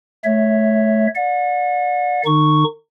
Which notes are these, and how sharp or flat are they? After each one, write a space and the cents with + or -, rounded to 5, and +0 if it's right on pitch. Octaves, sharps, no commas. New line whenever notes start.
A3 -25 C#5 +0 E5 +0
D5 +0 F#5 -40
D#3 -45 D#4 -30 C#6 +0